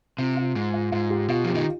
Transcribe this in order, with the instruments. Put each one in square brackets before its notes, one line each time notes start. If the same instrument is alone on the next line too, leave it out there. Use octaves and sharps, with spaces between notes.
[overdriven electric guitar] C3 [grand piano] F4
[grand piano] F4
[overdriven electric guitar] G#2
[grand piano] F4
[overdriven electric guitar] G#2 [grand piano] F4
[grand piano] G4
[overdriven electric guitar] B2 [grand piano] F4
[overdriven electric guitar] F3 [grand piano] G4
[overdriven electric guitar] D#3 [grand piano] D#4